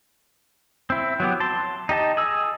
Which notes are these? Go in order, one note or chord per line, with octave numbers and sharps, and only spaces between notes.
C4 E4
F#3 B3 G4
A5 C6
D#4 G4 D#5 A5
G#4 E6